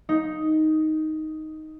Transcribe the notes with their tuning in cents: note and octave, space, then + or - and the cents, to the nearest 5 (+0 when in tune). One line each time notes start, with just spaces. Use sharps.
D#4 +5